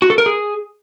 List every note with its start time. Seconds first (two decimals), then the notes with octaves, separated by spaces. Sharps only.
0.02 F#4
0.10 A4
0.18 A#4
0.26 G#4